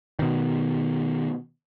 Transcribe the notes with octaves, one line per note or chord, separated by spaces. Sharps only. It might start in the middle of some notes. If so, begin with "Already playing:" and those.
B2 D#3